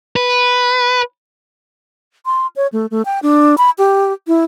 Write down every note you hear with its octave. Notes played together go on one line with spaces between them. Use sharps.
B4
C6
C#5
A3
A3
G5
D4
B5
G4
E4